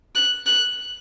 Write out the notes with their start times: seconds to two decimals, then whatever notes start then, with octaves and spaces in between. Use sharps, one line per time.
0.15 F#6
0.46 F#6